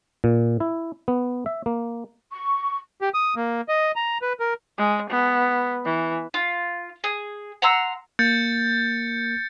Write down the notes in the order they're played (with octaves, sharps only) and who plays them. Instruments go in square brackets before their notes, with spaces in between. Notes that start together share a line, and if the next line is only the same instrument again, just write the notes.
[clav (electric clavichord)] A#2
E4
B3
E5
A#3
[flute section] C#6
[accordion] G4
D#6
A#3
D#5
A#5
B4
A#4
[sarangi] G#3
B3
E3
[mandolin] F4
G#4
F#5 A#5 C6 E6
[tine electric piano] A#3 [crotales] G6 A6 C#7